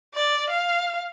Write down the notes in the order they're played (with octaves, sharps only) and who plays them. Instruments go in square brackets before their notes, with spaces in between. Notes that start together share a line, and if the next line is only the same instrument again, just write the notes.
[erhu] D5
F5